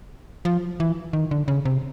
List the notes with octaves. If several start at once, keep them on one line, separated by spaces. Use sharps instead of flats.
F3
E3
D#3
D3
C#3
C3